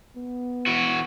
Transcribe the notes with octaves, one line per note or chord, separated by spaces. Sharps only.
B3
E3 F#4